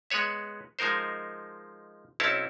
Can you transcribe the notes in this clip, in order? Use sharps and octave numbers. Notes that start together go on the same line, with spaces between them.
G#3 B3 B4 C#5 E5
F3 G#3 D#4 A#4 C5
B1 C4 C#4 E4 C#5 A5